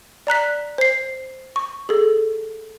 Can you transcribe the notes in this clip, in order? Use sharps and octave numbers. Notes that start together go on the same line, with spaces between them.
D5 A#5 F#6 B6
C5 C7
C#6
G#4 A4